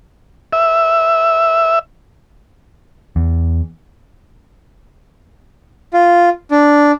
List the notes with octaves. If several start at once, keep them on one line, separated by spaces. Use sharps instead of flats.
E5
E2
F4
D4